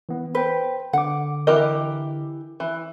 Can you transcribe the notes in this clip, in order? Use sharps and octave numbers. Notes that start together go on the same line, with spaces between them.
E3 B3
B4 C5 G5
D3 F#5 D6
E3 G4 A#4 D#5
E3